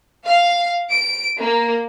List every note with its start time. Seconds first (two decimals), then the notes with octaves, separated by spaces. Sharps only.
0.24 F5
0.90 D7
1.37 A#3